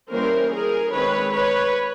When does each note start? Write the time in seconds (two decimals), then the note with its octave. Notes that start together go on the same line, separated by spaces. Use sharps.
0.11 E3 G3 A#3 C#4 A#4 C5
0.52 G#4 A#4
0.93 D#3 G#3 C4 B4 C#5
1.34 B4 C#5